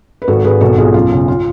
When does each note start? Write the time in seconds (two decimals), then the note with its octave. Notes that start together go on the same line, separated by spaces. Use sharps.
0.22 B4
0.28 G#1 F#4 A4
0.44 G#1 G#4 B4
0.61 B1 F#4 A4
0.78 B1 F4 G#4
0.94 F#2 F4
1.11 C#3
1.28 F4